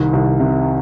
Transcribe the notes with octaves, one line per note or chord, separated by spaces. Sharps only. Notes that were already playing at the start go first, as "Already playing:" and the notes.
Already playing: C2 D#3
C2
C3